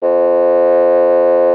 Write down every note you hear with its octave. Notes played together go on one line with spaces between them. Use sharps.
F2